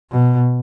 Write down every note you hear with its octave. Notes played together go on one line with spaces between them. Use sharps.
B2